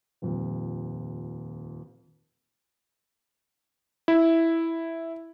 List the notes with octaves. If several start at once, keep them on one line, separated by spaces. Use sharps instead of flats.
D#1 F2
E4